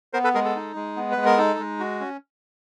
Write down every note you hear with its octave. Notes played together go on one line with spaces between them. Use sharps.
B3 A#4 C5
A4 B4
G#3 G#4 A#4
A4
D#4
G#3
B3
B4
G#3
A#4
D#4 A4
G#3
F#4
C#4